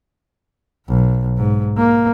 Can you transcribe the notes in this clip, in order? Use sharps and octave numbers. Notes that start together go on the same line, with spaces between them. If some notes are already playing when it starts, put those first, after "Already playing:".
B1
G#2
A#3